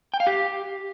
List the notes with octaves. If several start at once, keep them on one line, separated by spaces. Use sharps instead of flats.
G5
F5
G4